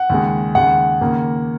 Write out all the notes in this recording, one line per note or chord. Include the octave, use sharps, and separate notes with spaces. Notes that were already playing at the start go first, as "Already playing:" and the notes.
Already playing: F#5
D#2 C#3 G#3
D#2 C#3 G#3 F#5
D#2 C#3 A#3